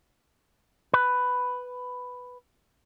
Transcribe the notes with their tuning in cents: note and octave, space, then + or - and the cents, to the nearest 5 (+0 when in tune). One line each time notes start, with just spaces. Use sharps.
B4 +10